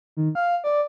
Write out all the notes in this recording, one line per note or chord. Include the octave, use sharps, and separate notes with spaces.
D#3
F5
D5